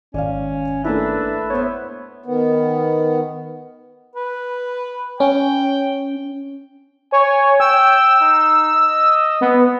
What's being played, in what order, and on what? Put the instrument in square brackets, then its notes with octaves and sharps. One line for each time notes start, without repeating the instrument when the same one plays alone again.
[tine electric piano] G#1 [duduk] C#4 [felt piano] D5 F5
[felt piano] A3 A#3 E4 [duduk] D4 [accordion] B4 E5
[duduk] B3 [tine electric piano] C5 C#5
[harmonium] D#3 B3
[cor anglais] B4
[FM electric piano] C#4 [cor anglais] G5
[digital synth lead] C#5 [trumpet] G#5
[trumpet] G5 [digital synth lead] E6
[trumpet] D#4
D#5
[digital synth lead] B3